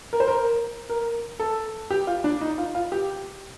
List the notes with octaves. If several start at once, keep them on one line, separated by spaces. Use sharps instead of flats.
A#4
C5
A#4
A#4
A4
G4
F4
D4
D#4
F4
F4
G4